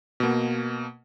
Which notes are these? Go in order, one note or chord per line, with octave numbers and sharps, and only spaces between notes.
B2 A#3